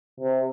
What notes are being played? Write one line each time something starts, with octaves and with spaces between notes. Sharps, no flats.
C3